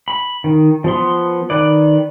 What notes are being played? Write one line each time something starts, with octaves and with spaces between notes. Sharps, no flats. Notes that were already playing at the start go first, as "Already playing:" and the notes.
B5
D#3
F3 B3 C6
D#3 B4 D5